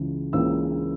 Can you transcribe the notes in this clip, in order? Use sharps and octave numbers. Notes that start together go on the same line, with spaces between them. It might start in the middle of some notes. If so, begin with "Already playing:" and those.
Already playing: C#2 C#3 E3
C#2 C#3 E3 A#3 E6